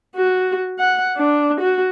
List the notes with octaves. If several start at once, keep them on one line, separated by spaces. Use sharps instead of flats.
F#4
F#5
D4
F#4